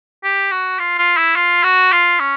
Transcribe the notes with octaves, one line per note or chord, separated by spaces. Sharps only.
G4
F#4
F4
F4
E4
F4
F#4
F4
C#4